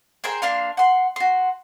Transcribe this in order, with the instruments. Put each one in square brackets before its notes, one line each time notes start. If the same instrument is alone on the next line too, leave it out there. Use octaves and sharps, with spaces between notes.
[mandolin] G#4 A#4 C5 G5
A#3 D4 F5 C6
F#5 C6
F#4 C6